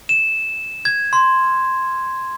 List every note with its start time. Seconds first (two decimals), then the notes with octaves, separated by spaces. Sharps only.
0.09 E7
0.85 G#6
1.13 C6